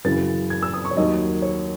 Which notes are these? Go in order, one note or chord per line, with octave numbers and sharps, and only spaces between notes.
F#2 C#3 E3 A6
G#6
E6
D#6
C#6
C#5
D#2 D#3 F#3 D#5
C#5